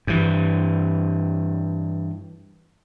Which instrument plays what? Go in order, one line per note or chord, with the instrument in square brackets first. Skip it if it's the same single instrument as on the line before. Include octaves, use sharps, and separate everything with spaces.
[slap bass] G2 E3